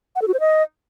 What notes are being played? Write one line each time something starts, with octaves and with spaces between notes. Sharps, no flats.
F#5
A4
F#4
C5
D#5